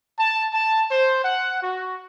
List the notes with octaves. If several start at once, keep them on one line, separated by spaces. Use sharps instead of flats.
A5
A5
C5
F#5
F#4